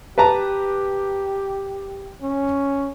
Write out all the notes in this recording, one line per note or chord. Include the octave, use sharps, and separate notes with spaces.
G4 B4 A5 A#5
C#4